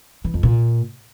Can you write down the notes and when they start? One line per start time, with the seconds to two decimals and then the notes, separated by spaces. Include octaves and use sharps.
0.24 E3
0.34 F2
0.43 A#2